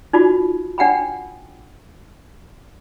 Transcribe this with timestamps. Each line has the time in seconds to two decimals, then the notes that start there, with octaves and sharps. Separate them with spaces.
0.13 D#4 F4 F#4
0.78 D4 F#5 G5 B5